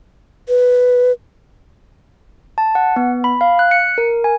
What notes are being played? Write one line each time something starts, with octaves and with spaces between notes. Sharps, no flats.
B4
A5
F#5
B3
B5
F5
F#6
C#7
A#4
G#5